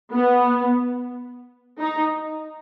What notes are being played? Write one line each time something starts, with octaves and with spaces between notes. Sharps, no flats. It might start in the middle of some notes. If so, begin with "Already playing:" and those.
B3
D#4